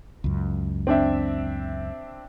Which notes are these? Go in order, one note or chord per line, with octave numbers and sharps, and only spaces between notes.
C#2 F#2
C4 D4 E5